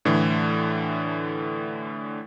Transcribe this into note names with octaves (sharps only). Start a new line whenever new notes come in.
A2 D3 E3